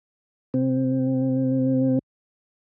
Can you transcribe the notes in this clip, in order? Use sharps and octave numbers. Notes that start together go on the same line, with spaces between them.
C3 C4